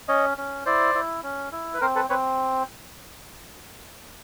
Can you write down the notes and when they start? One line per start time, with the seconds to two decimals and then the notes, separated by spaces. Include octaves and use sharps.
0.08 C#4 C#5 D#5
0.38 C#4
0.66 E4 C5 D5
0.95 E4
1.23 C#4
1.52 E4
1.74 B4
1.81 C4 A#4 C5
1.96 A4 B4
2.09 C4 B4 C#5